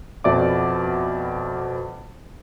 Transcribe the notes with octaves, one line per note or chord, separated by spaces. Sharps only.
F2 B2 D5 E5 D6